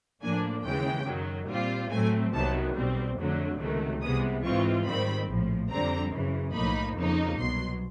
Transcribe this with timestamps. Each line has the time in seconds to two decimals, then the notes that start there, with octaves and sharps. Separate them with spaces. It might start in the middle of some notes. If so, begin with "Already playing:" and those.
0.22 A2 F3 A#3 D4 G#5
0.64 D#2 C#3 E3 G#3 G5
1.06 F#2 D#3 F#3
1.48 A#2 G3 C4 F4
1.91 A2 F#3 A3 C4 G#5
2.33 C2 C3 D#3 F#3 B3 A5
2.75 B1 B2 G3 C4
3.18 F2 D3 F#3 A3
3.59 C#2 C3 D#3 F#3 A3
4.02 C2 C3 E3 G#3 B3 D#6
4.43 G#2 E3 G#3 C4 F4 C#6
4.85 G#2 D#3 G3 C4 B5
5.28 A#1 A2 F3
5.70 F2 D3 G3 C4 A#5
6.12 F#2 C#3 E3
6.54 B1 A2 F3 A#3 D#4 B5
6.96 F2 C#3 F3 A#3 D#4
7.38 C2 B2 F#3 C6